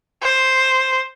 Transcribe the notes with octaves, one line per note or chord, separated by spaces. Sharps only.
C5